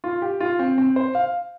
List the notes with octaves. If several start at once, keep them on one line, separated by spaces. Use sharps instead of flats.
F4
G4
F4
C4
C4
C5
F5